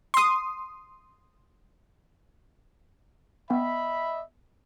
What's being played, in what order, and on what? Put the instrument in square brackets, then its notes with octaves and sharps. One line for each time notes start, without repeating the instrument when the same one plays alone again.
[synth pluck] C6 D#6
[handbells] B3 G5 [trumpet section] D#5 E5 B5